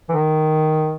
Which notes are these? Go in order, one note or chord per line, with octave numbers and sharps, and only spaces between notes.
E3
D#3